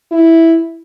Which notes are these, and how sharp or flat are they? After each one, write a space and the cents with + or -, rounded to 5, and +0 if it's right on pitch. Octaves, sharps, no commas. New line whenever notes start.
E4 -5